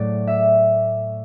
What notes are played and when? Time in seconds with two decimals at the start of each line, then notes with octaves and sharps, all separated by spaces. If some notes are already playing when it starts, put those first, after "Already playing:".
Already playing: A2 F#3 A3 D5
0.27 E5